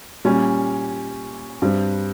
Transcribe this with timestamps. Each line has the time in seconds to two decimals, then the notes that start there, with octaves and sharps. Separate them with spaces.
0.25 A#2 G3 C#4
1.62 G2 G3 C4